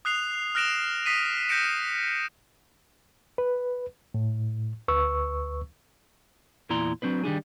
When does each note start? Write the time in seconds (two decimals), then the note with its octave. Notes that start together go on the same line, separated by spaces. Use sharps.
0.05 D#6 F#6 C7 F7
0.55 F6 F#6 A#6 D7 E7 F7
1.06 D#6 B6 C7 D#7
1.49 G6 A#6 B6 C#7 D7 E7
3.38 B4
4.14 A2
4.88 D2 B4 C#6 E6
6.70 E2 A#2 E4 D5 A#5 C6
7.02 F#3 C4 D4 B4
7.24 D#3 G3 D4 G#4